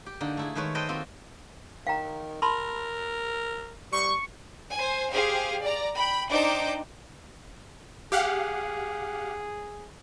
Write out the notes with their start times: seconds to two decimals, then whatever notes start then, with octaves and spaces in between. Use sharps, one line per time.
0.06 G4
0.21 D3 A#3 D#4
0.37 A3 E4 G#4
0.55 D#3 G#3 A3 B4 C#5
0.75 A4 B4 C5 D#5 G5
0.89 A#3 C4 F4 F#4 A4
1.87 D#3 F5 G5 A#5
2.42 A#4 A5 B5 C6
3.92 G3 C#6
4.73 C5 G#5
5.13 G4 G#4 C5 F5
5.61 D5 A#5
5.97 G5 B5
6.30 D4 D#4 C5 G5 D6 G6
8.12 G4 G#4 F5 F#5